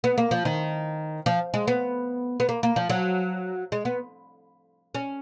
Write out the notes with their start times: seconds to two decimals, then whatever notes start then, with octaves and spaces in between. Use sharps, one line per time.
0.04 B3
0.18 A#3
0.31 F3
0.45 D#3
1.26 F3
1.54 G#3
1.67 B3
2.40 B3
2.49 A#3
2.63 A#3
2.76 F3
2.90 F#3
3.72 G#3
3.85 B3
4.95 C#4